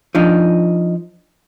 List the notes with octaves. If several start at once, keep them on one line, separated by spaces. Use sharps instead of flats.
F3 D4 D#4